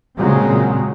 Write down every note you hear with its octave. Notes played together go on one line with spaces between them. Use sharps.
A#2 C#3 F#3 G#3 C4